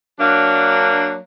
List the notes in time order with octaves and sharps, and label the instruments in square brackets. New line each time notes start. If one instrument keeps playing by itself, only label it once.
[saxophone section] F#3 A#3 D4